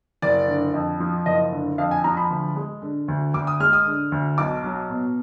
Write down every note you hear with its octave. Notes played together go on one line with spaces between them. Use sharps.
F#1 D5
D3
F2
F3
F#1 D#5
D3
F2 F5
G#5
F3 A#5
B5
D2
G#3
D3
D2
D2 D6
D#6
G#3 F6
D#6
D3
D2
B1 D6
F#3
B2